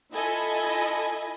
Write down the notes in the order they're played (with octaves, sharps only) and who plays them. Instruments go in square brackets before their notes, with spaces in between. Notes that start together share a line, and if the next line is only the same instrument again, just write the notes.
[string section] E4 F4 A4 D#5 G#5 B5